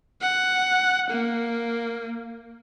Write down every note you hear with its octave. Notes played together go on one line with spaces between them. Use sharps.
F#5
A#3